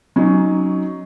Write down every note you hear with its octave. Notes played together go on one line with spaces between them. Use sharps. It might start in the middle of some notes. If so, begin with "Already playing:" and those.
F#3 C#4 D#4